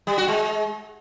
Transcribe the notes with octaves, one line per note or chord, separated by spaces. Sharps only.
G3
F#4
G#3